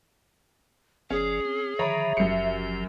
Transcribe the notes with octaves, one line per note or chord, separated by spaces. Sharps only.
F#1 F3 C#4 G#4 D5
C4
D3 D#3 F3 C#5 E5 A#5 B5
F#1 F#2 F3 G4 C#7